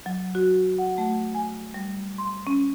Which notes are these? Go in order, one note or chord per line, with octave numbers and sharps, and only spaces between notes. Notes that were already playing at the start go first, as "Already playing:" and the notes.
F#3
F#4
F#5
A3
G#5
G3
C6
C#4